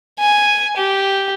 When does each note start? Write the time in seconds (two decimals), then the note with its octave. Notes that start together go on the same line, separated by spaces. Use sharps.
0.19 G#5
0.77 G4